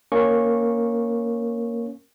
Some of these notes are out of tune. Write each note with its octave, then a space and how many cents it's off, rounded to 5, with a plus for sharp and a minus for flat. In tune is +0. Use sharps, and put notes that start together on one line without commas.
A#3 +0 C#4 +0 C#6 -15